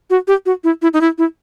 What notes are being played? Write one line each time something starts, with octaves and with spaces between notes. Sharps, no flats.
F#4
G4
F#4
E4
E4
D#4
E4
E4